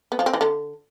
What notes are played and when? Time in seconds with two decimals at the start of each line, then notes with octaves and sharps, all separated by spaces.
0.12 B3
0.19 F3
0.26 C4
0.33 E3
0.41 D3